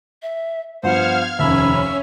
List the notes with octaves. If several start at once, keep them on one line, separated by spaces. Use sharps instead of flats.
E5
G2 F3 B3 C5 F5 F#5 F6 G#6
F1 D#2 C#4 E5 B5